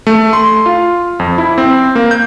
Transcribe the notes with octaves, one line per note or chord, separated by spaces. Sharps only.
A3
C6
F4
F2
E4
C4
A#3
G6